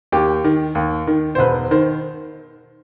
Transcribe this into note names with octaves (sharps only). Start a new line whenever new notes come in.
D#2 G4
D#3
D#2
D#3
C5
E1 B4
D#3 C5